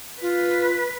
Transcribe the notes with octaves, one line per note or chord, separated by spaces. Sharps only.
F4 B4